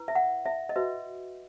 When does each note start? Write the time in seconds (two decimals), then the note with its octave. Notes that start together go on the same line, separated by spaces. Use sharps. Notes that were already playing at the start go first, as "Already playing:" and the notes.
Already playing: E4 B4
0.08 E5
0.15 F#5
0.46 E5
0.69 D#5
0.76 F#4 B4 E5